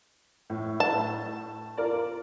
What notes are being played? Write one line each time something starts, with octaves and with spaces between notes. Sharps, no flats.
A2
A5
F4 A#4 D5